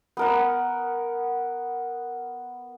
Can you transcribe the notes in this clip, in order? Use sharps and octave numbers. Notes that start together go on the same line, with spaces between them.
B3 A#4 F#5